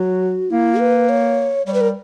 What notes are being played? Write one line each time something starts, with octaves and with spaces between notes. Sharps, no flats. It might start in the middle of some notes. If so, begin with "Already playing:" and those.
Already playing: F#3 F#4
A#3 E4
B4
C#5
G3 C#5
B4
A#4